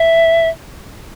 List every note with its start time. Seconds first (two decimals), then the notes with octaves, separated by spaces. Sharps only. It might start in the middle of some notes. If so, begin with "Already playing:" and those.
Already playing: E5